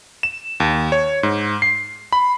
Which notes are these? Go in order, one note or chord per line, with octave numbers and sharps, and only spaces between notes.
E7
D#2
C#5
G#2
C7
B5